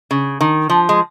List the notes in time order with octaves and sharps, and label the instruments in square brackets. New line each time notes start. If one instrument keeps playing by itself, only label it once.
[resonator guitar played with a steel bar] C#3
D#3
F3
G#3